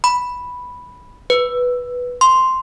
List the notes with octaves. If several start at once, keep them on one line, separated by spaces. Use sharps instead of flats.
B5
B4
C6